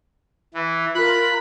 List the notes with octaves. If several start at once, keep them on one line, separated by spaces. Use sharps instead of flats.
E3
F4 A#4 B5 F#6